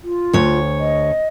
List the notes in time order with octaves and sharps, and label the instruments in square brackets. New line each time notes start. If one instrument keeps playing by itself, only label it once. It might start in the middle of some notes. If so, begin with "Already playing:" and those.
[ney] F4
[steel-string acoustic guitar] D2 C#5
[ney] D#5